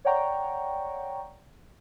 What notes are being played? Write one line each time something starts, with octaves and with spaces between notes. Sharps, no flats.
C#5 D5 F#5 G5 A#5 C#6